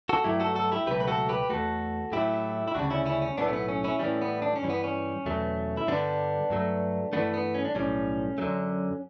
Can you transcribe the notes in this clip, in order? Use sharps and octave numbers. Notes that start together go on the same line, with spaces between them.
F#4 A4
G2 F#3 A3 E4 G4
F#4 A4
F#4 A4
E4 G4
C#2 B2 F#3 A3 G4 B4
B4
F#4 A4
G4 B4
E2 B2 A3 F#4 A4
A2 F#3 A3 E4 G4
E4
D2 C#3 G3 D4 F#4
C#4 E4
C#4 E4
C#4
B1 A2 F#3 A3 B3 D4
C#4
B3
C#4
C#4 E4
A2 E3 G3 C#4
B3
D4
C#4
G2 E3 G3
B3
C#4
E2 B2 F#3 A3
E4
G2 D3 G3 B3 D4
G2 F#3 A3
G2 E3 A3 B3 D4
B3
C#4
D4
B1 A2 G3 C#4
F#2 D3 F#3 A3